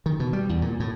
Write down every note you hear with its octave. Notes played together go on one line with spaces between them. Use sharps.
D#3
B2
G3
E2
A#2
A2